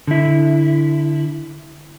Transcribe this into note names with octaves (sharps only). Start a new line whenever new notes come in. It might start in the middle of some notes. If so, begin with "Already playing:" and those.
D3 E4